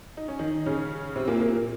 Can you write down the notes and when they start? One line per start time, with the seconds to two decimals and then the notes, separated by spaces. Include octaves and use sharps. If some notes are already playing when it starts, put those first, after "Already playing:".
0.17 D#4
0.28 C#4
0.39 D#3 D#4
0.66 C#3 C#4
1.16 C3 C4
1.28 A#2 A#3
1.40 A#2 A#3